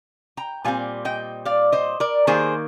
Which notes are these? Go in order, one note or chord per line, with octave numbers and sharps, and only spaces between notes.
G5 A#5
A#2 G3 C4 F5 G#5
D#5 G5
D5 F5
C5 D#5
A#4 D5
D#3 A#3 G#4 C5